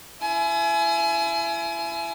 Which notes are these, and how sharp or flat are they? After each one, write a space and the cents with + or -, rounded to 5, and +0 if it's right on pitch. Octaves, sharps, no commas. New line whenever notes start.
E4 +30 G#5 +30